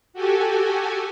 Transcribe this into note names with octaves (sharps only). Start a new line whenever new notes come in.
F#4 G4 A4 G#5